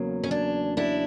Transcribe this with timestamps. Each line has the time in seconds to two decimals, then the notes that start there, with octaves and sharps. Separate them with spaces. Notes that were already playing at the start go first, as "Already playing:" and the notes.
Already playing: E2 C#3 F#3 A#3
0.24 C#4
0.31 D4
0.77 D4 E4